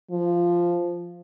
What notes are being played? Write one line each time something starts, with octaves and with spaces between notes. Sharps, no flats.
F3